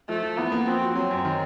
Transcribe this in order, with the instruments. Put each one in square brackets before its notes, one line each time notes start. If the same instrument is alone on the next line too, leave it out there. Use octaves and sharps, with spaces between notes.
[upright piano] F3 [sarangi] A3
[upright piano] F3
[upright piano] E3 [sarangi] B3
[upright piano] A#3
[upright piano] F3 [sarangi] C4
[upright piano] F#4
[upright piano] F#3 [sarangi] C4
[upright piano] F#2
D#3